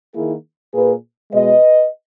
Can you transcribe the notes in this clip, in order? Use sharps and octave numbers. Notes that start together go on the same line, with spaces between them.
D#3 A#3 E4 G#4
A#2 A#3 G#4 B4
B2 G#3 B4 D#5